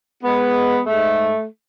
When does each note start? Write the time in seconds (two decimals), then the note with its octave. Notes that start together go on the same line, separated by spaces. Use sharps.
0.24 G#3 B3
0.86 G#2 G#3 A3